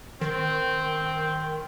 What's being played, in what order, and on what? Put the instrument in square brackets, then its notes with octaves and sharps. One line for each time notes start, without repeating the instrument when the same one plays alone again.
[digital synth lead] D#3 [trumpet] C4